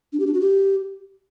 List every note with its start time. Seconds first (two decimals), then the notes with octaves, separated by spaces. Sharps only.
0.13 D4
0.20 G4
0.27 D4
0.34 F#4
0.41 G4